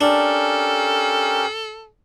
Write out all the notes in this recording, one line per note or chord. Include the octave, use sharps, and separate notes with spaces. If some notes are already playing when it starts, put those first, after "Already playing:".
C#4 D4 G4 A4 A#4